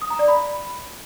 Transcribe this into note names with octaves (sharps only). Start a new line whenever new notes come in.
D#6
A#5
D5
B5